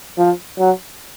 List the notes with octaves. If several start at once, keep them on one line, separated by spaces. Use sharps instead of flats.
F3
F#3